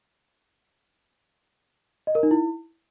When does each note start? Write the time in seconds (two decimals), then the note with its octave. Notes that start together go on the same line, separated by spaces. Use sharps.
2.07 D#5
2.15 A#4
2.23 D#4
2.31 E4